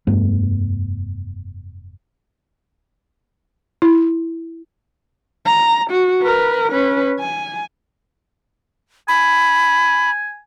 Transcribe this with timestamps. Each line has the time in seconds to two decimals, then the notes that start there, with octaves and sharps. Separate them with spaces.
0.07 F1 G2 A3 B3
3.82 E4
5.46 A#5
5.90 F#4
6.22 A#4 B4
6.70 C#4 B4
7.20 G#5
9.08 G#5 B5